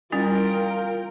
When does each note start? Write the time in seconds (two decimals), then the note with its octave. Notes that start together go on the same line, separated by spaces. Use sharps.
0.12 G3 C#4 E4 F4 A#4 G5